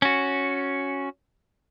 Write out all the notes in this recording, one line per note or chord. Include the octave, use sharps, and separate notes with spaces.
C#4 F#4